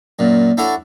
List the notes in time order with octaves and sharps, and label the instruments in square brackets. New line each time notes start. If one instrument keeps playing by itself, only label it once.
[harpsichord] F#2 A#2
D4 E4 F#4 A4 C#5